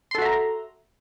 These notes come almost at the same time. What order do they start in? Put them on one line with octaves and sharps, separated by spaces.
C6 A4 F#4 E5 A#5